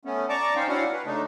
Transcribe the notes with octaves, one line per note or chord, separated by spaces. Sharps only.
A3 B3 C#4
D5 A5 A#5 C#6 D6
C#4 D#4 C5 F5 G5
C#4 D4 E4 F#4 F5 F#5
B4
C#3 A3 D4 D#4